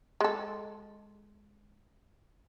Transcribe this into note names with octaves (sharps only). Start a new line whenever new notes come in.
G#3 A4